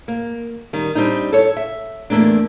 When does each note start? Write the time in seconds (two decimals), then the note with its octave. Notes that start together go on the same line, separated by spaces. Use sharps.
0.08 A#3
0.73 D#3 G3
0.95 G3 C4 D4 D#4
1.33 A4 C#5
1.57 E5
2.10 E2 B2 A3 A#3 D4